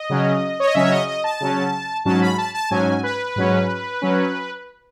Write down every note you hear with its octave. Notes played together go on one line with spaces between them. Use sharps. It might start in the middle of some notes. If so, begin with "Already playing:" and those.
Already playing: D#5
C#3 F#3 C#4
C#5
D#5
C#3 F#3 C#4 E5
C#5
D#5
D#5
A5
C#3 F#3 C#4
G#2 F#3 C#4 A5
B5
A5
A5
G#2 F#3 C#4 G#5
B4
G#2 F#3 C#4
F#3 C#4